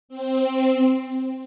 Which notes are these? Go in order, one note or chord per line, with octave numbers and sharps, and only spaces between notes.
C4
C4